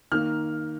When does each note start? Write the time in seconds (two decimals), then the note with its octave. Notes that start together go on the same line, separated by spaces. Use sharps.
0.12 D#3 A#3 F6